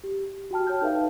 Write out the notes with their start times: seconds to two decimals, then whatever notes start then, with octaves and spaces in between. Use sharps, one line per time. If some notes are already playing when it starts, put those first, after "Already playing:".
0.04 G4
0.51 F#4 G4 G5 A5 F6
0.67 C#5 G5 A5 F6 G6
0.81 D#4 A4 B4 E5 F5